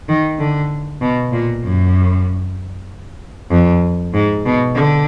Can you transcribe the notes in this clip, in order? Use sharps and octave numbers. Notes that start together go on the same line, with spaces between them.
D#3
D3
B2
A#2
F#2
F2
G#2
B2
D3